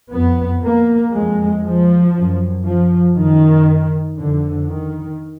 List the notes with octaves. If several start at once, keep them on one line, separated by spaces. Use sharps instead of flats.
F2 B3
A#3
F2 G#3
F3
F#2
F3
F#2 D#3
F2 D3
D#3